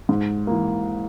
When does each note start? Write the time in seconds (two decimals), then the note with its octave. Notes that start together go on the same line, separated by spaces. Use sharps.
0.09 G#2
0.47 E3 A#3